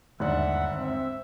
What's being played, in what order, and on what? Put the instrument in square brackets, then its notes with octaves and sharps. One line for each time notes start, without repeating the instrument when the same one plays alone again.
[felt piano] G1 G#2 D5 [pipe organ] D#2 E5 F#5
[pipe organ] C4 E5